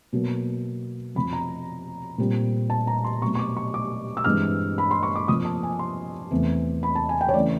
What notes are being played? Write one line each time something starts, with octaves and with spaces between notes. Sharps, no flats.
B2 F#3 A#3
F2 C3 F3 B5
A#5
A#2 G3 C4
A5
A#5
C6
B2 F#3 A3 C4 C#6
C#6
D6
C#6
D6
E6
G2 E3 G#3 C4 F6
B5
C6
C#6
D6
C3 F3 A#3 D#6
A5
G#5
C6
E2 C3 E3 A3 C4
B5
A5
G#5
G5
C#5
C#3 E3 A3 C4 D5